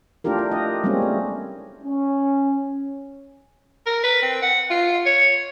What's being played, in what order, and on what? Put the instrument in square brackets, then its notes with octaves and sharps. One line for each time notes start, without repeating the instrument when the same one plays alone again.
[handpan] A3 D4 E4 F4 G4 A#4
D4
D#5
G3 G#3 A#3 C4 C#4
A3
[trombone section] C#4
[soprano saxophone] A#4
B4
C4
F#5
F4
C#5